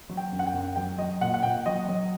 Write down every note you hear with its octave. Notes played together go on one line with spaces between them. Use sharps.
F#3
G5
F#2
F#5
G5
F#2
F#3 G5
F#3 D#5
A#2 F#5
F#5
A#2 G5
F#3 D#5
F#3